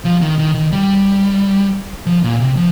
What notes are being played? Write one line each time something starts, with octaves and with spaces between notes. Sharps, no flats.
F3
D#3
D#3
D#3
G3
F3
A#2
C3
F3